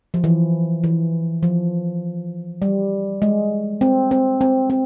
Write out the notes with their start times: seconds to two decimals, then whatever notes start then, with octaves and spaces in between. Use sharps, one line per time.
0.14 F3
0.24 E3
0.84 E3
1.43 F3
2.62 G3
3.22 G#3
3.81 C4
4.11 C4
4.41 C4
4.70 C4